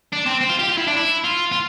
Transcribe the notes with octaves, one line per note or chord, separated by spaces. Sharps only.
D4
C4
C4
F4
G4
F4
E4
D4
E4
F4
F4